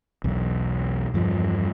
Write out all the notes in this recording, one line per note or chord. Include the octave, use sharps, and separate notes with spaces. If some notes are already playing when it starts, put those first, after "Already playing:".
B1 E2
E2 G2 F3